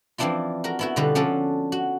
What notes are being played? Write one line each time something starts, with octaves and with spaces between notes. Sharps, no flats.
E3 F3 C4 D4 E4 F4
F#4 A#4
B3 E4 F#4
B2 D3 G3 F4 F#4 B4
F3 C#4 D4 F#4 A4
F#4